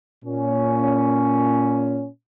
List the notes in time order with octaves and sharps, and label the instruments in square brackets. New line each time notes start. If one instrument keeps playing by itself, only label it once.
[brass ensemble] A#2 C#4